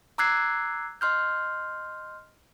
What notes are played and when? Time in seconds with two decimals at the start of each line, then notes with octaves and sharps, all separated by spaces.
0.18 A#5 D6 E6 F#6 G#6 C7
1.01 D#5 C6 F6 G6